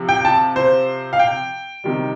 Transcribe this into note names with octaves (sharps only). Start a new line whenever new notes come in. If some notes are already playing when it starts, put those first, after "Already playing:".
Already playing: C3 F3
G5
A5
C5
F5
G5
C3 D#3 G3